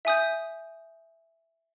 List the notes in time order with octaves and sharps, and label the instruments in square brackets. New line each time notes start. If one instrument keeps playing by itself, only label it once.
[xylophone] E5 G#5 D#6 G6